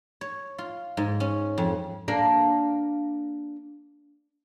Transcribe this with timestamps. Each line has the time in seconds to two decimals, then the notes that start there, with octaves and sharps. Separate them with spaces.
0.21 C#5
0.58 F4
0.97 G#2
1.20 C#4
1.58 F2
2.08 A#3 D4